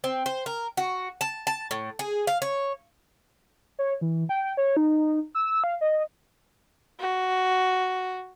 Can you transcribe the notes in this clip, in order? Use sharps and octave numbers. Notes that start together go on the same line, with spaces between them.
C4
C5
A#4
F#4
A5
A5
A2
G#4
F5
C#5
C#5
E3
G5
C#5
D#4
E6
F5
D#5
F#4